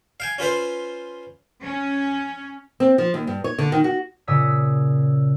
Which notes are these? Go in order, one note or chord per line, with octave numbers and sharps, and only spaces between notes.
F5 G5 G#5
C#4 F4 B4 C5
C#4
C4
F3
D#2
G2
C#5
D3
D#3
F#4
A#2 C#3 C#5 D#6 E6 B6